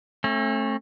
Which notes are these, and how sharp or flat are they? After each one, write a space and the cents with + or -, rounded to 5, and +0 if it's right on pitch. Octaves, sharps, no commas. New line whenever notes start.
A3 +0 C#4 -45